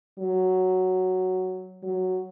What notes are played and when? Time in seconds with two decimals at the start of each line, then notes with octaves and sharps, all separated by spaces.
0.19 F#3
1.83 F#3